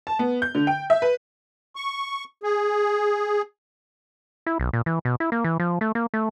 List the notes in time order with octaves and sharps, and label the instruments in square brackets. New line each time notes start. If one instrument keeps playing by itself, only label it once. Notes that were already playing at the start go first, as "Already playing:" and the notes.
[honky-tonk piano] A5
B3
G6
D3
G5
E5
B4
[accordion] C#6
G#4
[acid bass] E4
B1
A#2
E3
B2
E4
A#3
E3
F3
A3
A#3
A3